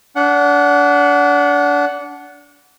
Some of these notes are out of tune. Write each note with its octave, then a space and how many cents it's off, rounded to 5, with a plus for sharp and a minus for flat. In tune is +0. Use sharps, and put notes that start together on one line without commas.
D4 -30 F#5 +0